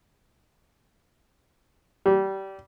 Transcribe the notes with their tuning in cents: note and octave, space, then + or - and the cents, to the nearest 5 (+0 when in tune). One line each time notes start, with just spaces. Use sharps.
G3 -20